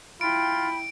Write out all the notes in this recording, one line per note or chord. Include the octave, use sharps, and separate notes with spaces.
E4 F4 G5 B5 D7